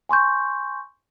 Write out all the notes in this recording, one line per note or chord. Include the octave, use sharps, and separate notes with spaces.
G#5 C6 C#6 G6